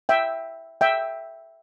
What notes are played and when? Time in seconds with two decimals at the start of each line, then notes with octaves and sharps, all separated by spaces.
0.09 E5 G5
0.81 E5 G5